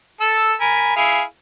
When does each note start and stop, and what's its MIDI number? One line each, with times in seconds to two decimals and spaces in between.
0.21 0.54 69
0.21 0.54 88
0.60 0.94 70
0.60 0.94 80
0.60 0.94 83
0.96 1.22 64
0.96 1.22 68
0.96 1.22 77